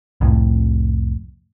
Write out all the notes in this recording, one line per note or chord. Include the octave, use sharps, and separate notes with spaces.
C2 F2 A2